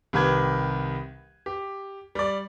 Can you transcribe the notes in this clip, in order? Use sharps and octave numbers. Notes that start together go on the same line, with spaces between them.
C2 D#3 G4 B4 G#6
G4
G3 D5